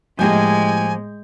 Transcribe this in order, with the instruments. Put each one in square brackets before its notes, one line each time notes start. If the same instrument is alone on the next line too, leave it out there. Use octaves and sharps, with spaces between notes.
[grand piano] A2 G4 G6 [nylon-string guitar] F3 A#3 D#5 [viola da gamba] G#3 [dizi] G#5